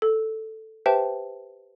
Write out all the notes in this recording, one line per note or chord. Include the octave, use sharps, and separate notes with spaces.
A4
G4 B4 C5 E5 G5 A5